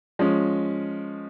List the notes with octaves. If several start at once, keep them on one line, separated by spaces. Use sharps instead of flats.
F3 G#3 C#4